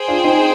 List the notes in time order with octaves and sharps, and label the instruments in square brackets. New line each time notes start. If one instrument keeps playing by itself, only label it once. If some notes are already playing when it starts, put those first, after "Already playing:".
Already playing: [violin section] G#4 C5 G5
[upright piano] D4 F4
C4 D#4